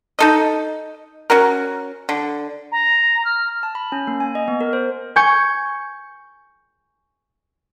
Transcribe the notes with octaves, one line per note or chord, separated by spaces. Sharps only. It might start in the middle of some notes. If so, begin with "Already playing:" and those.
D#4 A4 D#5
C#4 F#4 A#4
D3
A#5
F6
A5
B5
C#4
A#3
G#5
D#5
B3
A#4
C5
G#5 C#6 G6 C#7